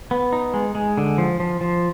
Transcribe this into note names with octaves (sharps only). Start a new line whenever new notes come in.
B3
D#4
G#3
G#3
D3
F3
F3
F3